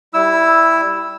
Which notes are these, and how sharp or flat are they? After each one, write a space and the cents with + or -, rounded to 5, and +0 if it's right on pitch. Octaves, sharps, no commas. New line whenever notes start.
G3 -10 E4 +0 E6 +0